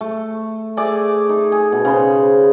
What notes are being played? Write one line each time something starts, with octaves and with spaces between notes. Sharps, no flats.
A3
A3 G#4 D5 E5
D#4
G#4
B2
C#3 C5 B5